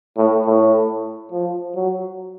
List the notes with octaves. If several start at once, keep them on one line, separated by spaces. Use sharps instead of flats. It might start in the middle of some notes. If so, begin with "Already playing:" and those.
A2
A2
F3
F#3